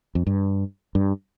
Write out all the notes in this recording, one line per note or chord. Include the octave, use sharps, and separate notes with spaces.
F2
G2
G2